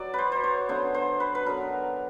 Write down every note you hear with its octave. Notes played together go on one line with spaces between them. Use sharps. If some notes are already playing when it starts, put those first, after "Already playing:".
Already playing: F#3 D5
B4 C5
C5
C#5
D3 F#3 B3 C5
C5
B4
B4
D3 F#3 B3 A#4